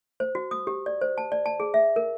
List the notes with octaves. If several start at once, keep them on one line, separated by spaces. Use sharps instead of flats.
C5
F#4
D#6
G4
D5
C5
A5
D5
A5
G#4
E5
A#4